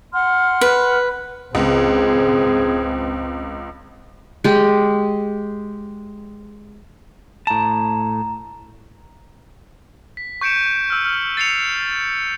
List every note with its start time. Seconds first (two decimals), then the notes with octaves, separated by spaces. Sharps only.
0.13 F#5 C6 F6
0.61 B4
1.55 C#2 C4 G#4
4.44 G#3 G4
7.47 A2 A5 A#5
10.17 B6
10.41 C#6 G6 C#7 D7 E7
10.90 E6 F6
11.05 F6
11.37 A6 C7 C#7 F7